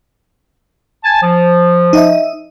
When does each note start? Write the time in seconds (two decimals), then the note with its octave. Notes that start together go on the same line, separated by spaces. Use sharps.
1.04 G#5 A5
1.22 F3
1.93 D#4 D#5 E5